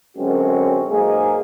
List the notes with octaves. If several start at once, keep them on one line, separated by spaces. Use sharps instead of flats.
F#2 D3 G#3 C4 C#4 F#4
B1 G#2 A#3 D#4 G#4